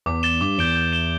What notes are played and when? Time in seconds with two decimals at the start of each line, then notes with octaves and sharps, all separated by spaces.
0.06 E2 D6
0.23 A6 E7 G7
0.41 G2 D6
0.58 E2 G6 D7 G7
0.75 G6
0.93 E7 G7